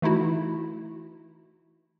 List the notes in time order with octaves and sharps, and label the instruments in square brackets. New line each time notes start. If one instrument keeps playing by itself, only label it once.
[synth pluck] E3 A3 D#4 E4 F#4